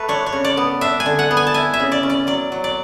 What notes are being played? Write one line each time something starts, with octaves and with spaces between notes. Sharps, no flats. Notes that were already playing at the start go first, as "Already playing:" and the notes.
Already playing: A3 A4 B4
D4 C#5
C#5
C#3
D5
B3
D4 E5
G#5
D3
F#5
B3
G#5
A5
E4 G#5
E5
C#3
D5
C#4
D5
F#3 D5
F#3
D5